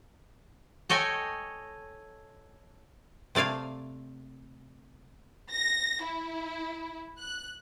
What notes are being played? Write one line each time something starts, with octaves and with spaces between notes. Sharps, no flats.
A4 C#5 D#5 G5 G#5
C3 A3 D5 F5 G#5
A#6
E4
F#6